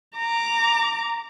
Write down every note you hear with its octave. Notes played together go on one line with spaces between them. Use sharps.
A#5 D6